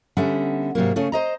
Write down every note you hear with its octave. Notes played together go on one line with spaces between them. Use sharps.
D3 G3 B3 C#4 E5 F#5
G#2 C3 F#3 A#3
C#3 A3 C#4
C5 D#5 A#5